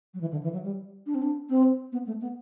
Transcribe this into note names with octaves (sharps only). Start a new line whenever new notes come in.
F#3
E3
D3
E3
F#3
G3
D4
C4
D4
C4
B3
A3
B3